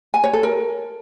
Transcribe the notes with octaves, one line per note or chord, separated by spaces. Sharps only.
G#5
C#5
A4
A#4